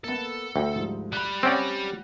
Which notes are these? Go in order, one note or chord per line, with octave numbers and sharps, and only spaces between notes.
A#3 B3 A4
D2 G5
G#2 F3 G3
G3 B5 F#6
C4 C#4 D5 F#5 G5 A#6